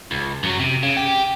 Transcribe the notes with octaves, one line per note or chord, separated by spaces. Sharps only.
C#2
F#2 F#3
C3
C#3
G4